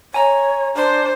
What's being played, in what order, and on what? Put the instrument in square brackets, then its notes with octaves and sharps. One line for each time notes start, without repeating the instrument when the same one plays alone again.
[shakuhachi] C#5 [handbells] G#5 A#5
[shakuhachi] D4 [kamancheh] C5